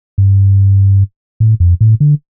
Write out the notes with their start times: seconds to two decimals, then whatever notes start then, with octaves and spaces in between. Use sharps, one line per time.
0.18 G2
1.40 A2
1.60 F2
1.81 A2
2.00 D3